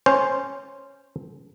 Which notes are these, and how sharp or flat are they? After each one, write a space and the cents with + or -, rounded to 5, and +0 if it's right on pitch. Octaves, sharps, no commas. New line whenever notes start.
C#4 -10 C5 +0